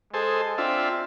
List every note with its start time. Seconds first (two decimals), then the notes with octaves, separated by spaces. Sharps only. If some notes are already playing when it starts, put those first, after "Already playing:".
0.14 G#3 G#4 A4 C5
0.58 C4 D4 F4 E5